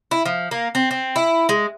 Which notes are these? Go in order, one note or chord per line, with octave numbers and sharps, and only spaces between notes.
E4
F3
A#3
C4
C4
E4
G#3